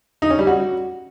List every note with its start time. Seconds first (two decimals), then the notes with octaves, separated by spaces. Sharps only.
0.22 D#4
0.30 C#4
0.39 G3
0.47 F#4